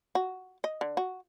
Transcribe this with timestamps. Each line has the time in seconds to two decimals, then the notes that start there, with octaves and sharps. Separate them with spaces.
0.15 F#4
0.64 D#5
0.81 D3
0.97 F#4